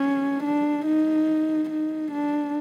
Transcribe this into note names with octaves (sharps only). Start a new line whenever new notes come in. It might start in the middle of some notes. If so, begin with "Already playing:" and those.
Already playing: C#4
D4
D#4
D#4
D4